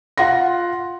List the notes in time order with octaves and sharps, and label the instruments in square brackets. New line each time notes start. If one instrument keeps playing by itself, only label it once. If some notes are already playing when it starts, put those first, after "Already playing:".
[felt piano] F4 F#5 C6 A#6